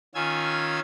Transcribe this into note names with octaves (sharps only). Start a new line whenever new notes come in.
D#3 C#4 F4 G#5 E6 G#6